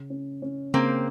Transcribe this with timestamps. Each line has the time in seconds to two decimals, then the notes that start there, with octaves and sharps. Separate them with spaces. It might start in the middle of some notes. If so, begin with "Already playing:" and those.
Already playing: C#3
0.10 C#4
0.42 C#4
0.74 C#3 A#3 C4